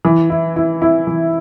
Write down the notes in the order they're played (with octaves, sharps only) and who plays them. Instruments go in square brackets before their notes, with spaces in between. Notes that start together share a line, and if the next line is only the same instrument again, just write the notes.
[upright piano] E3
E4
E4
E4
E3